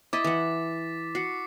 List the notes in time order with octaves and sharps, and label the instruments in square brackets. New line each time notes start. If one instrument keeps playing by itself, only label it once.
[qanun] E4 D#5 [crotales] D6 A6 B6
[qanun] E3 F#5
[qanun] F#4 [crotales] C7 C#7